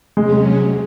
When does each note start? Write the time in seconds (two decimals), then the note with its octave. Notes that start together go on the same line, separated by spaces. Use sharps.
0.16 C3 F#3 G#3 C#4
0.33 G#3